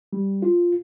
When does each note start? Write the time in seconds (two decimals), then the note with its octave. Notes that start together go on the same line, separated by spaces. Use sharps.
0.13 G3
0.42 F4